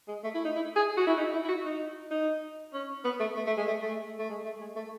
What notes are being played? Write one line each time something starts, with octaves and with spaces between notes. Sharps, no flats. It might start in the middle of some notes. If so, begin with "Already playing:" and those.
G#3
A3
E4
D#4
E4
G#4
F#4
E4
D#4
E4
E4
F#4
D#4
D#4
C#4
B3
A3
A3
A3
G#3
A3
A3
A3
G#3
A3
G#3
A3